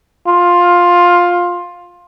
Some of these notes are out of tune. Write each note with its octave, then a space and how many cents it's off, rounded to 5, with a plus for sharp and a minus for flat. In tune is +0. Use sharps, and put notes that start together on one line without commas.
F4 +10